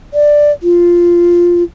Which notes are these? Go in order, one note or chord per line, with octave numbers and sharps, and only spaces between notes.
D5
F4